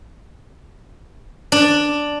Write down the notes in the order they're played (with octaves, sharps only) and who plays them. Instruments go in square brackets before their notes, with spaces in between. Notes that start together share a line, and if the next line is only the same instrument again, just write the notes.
[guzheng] D4